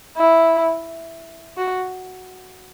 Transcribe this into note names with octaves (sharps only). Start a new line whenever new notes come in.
E4
F#4